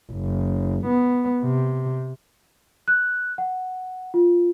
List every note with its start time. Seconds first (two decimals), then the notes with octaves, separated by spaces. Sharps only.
0.12 F#1
0.87 B3
1.43 C3
2.88 F#6
3.38 F#5
4.14 F4